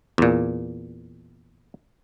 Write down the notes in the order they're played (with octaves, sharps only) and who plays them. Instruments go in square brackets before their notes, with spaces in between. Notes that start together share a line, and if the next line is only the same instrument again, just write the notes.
[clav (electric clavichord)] E2 A#2